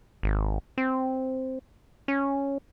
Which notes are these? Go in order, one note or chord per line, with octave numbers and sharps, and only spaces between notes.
G#1
C4
C#4